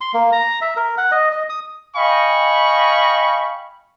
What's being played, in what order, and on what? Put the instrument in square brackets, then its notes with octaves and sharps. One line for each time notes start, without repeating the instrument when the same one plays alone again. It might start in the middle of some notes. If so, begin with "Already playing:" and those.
[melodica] C6
A#3
A#5
E5
A#4
F#5
D#5
D#5
D#6
[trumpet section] D#5 F5 G5 G#5 B5 C#6